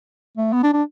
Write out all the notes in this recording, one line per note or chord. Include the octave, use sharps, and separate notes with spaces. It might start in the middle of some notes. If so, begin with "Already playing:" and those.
A3
B3
D4
D4